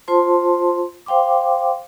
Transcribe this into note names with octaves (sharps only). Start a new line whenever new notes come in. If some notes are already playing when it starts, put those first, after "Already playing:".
F4 C5 A5 C6
C5 F5 G5 C6 D6